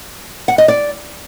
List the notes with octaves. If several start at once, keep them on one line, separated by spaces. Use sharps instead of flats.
F#5
D#5
D5